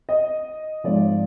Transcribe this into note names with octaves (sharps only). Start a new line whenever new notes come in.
D#5
G#2 F3 D5